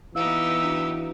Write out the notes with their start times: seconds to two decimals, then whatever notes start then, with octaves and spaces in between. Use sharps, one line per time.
0.15 E3 B3 D#4 E4 G4 F5 E6
0.64 D4 F#4